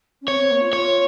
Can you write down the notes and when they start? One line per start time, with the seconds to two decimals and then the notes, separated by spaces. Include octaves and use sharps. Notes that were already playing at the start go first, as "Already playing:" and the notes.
0.22 C#4
0.28 C4 C#5
0.40 C4
0.51 A#3
0.61 F4
0.72 F4 C#5